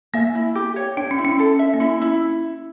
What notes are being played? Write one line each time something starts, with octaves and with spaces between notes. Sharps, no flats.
A#3 E5
E4
G4
C#5
D4 G5
C#4
E4
C#4
C#4 A4
E5
A#3
C#4 E4
E4